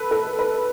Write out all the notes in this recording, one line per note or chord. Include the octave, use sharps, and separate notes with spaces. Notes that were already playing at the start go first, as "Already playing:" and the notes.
Already playing: A4 B4
A4
B4